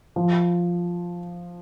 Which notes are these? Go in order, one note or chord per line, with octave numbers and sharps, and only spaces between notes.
F3